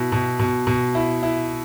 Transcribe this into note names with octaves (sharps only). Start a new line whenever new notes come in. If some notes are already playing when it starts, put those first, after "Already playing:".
Already playing: B2 E4
B2
B2
B2
E4
E4